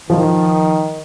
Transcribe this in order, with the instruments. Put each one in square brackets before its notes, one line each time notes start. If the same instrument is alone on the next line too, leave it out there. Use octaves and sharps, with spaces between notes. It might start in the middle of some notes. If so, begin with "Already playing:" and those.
[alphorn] D#3 [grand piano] F3